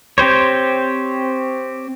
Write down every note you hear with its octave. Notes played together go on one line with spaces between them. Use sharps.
C4 G4 C5 C#5